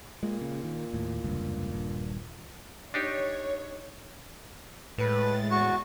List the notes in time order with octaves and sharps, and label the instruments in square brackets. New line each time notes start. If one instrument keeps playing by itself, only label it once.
[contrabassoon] A#2 [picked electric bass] G#3
[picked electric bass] C#3
D#3
D#2 A2
F1 C#2 G2
D#1 G2
[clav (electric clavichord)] D4 D#4 G4 [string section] C#5
[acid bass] A2 [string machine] G#3 A6 [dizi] B4
[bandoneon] E2 F#4 [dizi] C#6